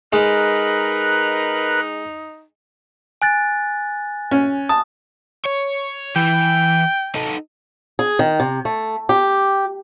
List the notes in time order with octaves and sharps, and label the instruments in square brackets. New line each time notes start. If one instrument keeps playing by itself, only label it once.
[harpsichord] G#3 [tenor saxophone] D#4 [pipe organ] A#4 B4 F#6
[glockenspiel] G#5 F#6 A6
[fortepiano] C#4
[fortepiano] A5 [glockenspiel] D#6
[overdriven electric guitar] C#5
[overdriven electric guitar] E3 [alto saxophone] G5
[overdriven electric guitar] D#4 A4
[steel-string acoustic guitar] G#4
D#3
C3
A3
G4